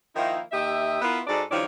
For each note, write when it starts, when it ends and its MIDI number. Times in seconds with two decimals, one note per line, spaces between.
0.16 0.39 51
0.16 0.39 53
0.16 0.39 58
0.16 0.39 63
0.16 0.39 64
0.52 0.98 39
0.52 0.98 67
0.52 0.98 75
0.52 0.98 76
1.02 1.20 59
1.02 1.20 64
1.02 1.20 65
1.02 1.20 70
1.02 1.20 71
1.27 1.41 44
1.27 1.41 66
1.27 1.41 69
1.27 1.41 74
1.51 1.64 43
1.51 1.64 51
1.51 1.64 53
1.51 1.64 64
1.51 1.64 73
1.51 1.64 74